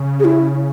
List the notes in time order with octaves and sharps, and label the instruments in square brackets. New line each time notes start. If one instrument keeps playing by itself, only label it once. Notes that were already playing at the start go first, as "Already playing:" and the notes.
Already playing: [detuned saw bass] C#3
[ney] G#4
E4